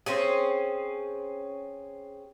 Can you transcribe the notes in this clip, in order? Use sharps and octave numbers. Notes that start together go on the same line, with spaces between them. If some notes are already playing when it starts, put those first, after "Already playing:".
C4 C#4 G#4